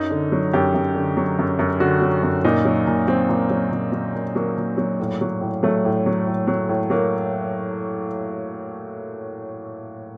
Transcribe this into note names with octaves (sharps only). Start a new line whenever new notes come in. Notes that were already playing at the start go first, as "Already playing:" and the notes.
Already playing: F#2 D#4
D3
F#3
F#2 G4
F#2
D3
F#3
F#2
F#2
D3 F#4
F#3
F#2
A#2 D#4
F#3
A#2
F#3 C4
A#2
F#3
A#2
F#3
A#2
F#3 A#3
A#2
F#3
A2
F#3
A2
F#3 A3
A2
F#3
A2
F#3
A2
F#3 A#3